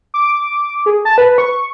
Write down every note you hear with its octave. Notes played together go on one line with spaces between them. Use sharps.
D6
G#4
A5
B4
C#6